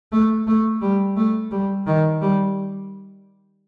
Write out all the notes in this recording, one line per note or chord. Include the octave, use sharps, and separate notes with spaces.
A3
A3
G3
A3
G3
D#3
G3